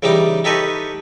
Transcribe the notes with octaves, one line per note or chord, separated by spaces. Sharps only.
C#3 E3 G3 D#4 G5 D6
D#4 G4 A4 B4 D#5 C#6